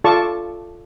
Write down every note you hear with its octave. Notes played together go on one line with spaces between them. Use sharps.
F4 A4 D5 A5 C#6